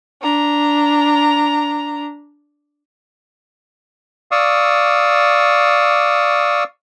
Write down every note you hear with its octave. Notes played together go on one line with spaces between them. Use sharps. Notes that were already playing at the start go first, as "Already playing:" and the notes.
D4 A#5
D5 F5 C#6 D#6 E6